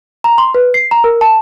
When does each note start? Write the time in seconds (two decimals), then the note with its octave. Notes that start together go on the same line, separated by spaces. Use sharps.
0.24 A#5
0.38 C6
0.55 B4
0.74 C7
0.91 A#5
1.04 A#4
1.21 A5